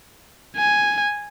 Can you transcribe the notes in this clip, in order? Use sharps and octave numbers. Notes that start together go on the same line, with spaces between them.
G#5